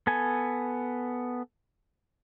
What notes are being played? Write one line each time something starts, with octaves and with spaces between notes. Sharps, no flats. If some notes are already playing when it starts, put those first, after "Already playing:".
B3 A4 G#5